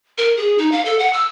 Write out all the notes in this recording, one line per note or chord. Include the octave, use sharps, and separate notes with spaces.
A#4
G#4
D#4
F5
A4
F#5
E6